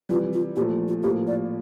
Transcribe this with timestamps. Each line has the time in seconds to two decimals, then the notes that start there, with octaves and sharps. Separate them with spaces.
0.09 C3 E3 G3 F4
0.33 F4
0.56 A#2 F3 A3 G4
0.88 F4
1.03 A2 F3 A#3 G4
1.27 D5